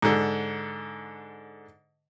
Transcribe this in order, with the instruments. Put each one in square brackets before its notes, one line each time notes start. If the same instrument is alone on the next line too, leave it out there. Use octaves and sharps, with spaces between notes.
[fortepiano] G#2 D3